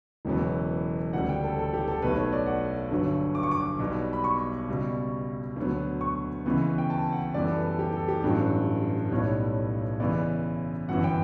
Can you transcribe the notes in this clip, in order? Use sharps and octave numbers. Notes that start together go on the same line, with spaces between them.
E1 E2 C#3 F#3 B3
D2 C#3 G3 F#5
G5
A4
A4
G4
A4
B1 B2 A3 B4
C#5
D5
F#5
G1 G2 D3 F#3
D6
C#6
D6
B1 B2 G3 B3
B5
C#6
C#2 B2 G3
D2 D3 F#3 B3
C#6
C#2 C#3 E3 B3
G5
A5
F#5
F#2 E3 G3 B3 D5
A4
B4
A4
G4
A4
G4
A1 G2 F#3 A4
B1 A2 G3 B3 C#5
C#2 C#3 E3 B3 D5
G1 F#2 E3 B3 F#5
G5